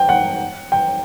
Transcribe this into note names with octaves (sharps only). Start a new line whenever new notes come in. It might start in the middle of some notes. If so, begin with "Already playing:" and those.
Already playing: G5
F#5
G5